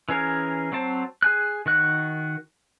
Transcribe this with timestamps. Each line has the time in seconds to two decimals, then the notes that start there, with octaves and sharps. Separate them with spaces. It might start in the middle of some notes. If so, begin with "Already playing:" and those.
0.09 E3 C#4 G#4 A#4
0.72 F#3 C4 C5 A5
1.22 G#4 G#5 F#6
1.66 D#3 F#4 F#6